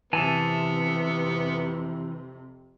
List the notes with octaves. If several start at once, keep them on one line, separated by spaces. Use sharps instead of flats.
F2 C3 E3 B3 G#5 A5